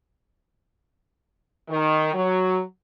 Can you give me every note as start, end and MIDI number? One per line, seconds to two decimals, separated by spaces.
1.70 2.13 51
2.14 2.61 54